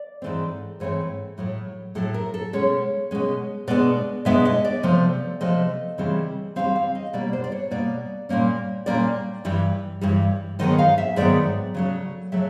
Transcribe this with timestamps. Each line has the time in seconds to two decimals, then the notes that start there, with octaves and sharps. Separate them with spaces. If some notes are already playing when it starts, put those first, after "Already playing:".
Already playing: D5
0.22 G#2 E3 A3 C4
0.80 G#2 E3 A3 C4 C#5
1.38 A2 F#3 A3
1.95 A2 F#3 A3 A4
2.14 A#4
2.34 A4
2.53 B2 G#3 C#4 C#5
3.11 B2 G#3 C#4
3.67 B2 G#3 B3 D4 D5
4.25 B2 G#3 B3 D4 E5
4.45 D#5
4.65 D5
4.83 C3 F3 A3
5.41 C3 F3 A3 D#5
5.98 C#3 E3 G3 C4
6.56 C#3 E3 G3 C4 F5
6.76 F5
6.95 D#5
7.13 B2 G3 A#3 D5
7.33 C5
7.44 D5
7.52 C#5
7.71 B2 G3 A#3 D5
8.29 A#2 G3 A#3 C#4
8.86 A#2 G3 A#3 C#4 D5
9.45 G2 E3 G3
10.01 G2 E3 G3
10.59 G#2 D#3 F#3 B3 D#5
10.79 F5
10.98 E5
11.16 G#2 D#3 F#3 B3 D5
11.74 C#3 F#3 A3
12.32 C#3 F#3 A3 E5